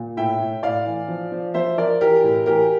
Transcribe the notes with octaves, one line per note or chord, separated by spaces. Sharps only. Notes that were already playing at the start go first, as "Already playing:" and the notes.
Already playing: A#2
A2 E5 G5
A2
A2 D5 F5
E3
F3
F3
F3 C5 E5
F3 A#4 D5
E3 G4 A#4
A2
E3 G4 A#4